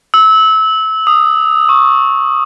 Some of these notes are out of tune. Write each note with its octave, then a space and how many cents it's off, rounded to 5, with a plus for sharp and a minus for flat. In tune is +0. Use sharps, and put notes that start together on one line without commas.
E6 -25
D#6 -20
C#6 -10